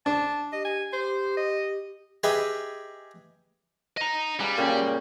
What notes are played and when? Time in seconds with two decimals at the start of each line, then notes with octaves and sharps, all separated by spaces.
0.06 D4 A5
0.53 G4 D#5
0.65 G#5
0.93 G4 C5
1.37 D#5
2.23 G4 G#4 B4 D#5 E5 G5
3.97 D#5 A#5
4.40 G3 G#4 B4 F5
4.58 A#2 C#3 G5